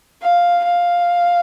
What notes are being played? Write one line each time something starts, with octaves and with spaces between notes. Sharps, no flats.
F5
F5